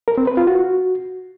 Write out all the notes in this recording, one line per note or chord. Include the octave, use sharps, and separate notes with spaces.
A#4
C4
B4
F4
F#4